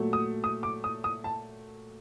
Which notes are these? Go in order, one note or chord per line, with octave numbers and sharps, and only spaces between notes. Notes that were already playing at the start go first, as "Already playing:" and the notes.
Already playing: A#2 F#3 A3
D#6
D#6
D6
D#6
D#6
A5